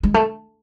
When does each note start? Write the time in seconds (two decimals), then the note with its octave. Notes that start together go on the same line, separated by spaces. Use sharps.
0.03 G#3
0.14 A3